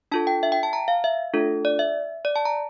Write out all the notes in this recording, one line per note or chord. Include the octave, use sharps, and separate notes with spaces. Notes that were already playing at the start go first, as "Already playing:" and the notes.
D4 F4 A4 A5
G5
E5
G5
A5
A#5
F5
E5
A3 D4 F4 A4
D5
E5
D5
A5
A#5